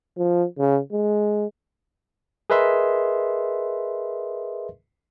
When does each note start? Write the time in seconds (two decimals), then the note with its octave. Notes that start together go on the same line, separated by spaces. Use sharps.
0.18 F3
0.59 C#3
0.93 G#3
2.50 G#4 A#4 B4 D#5 E5 C6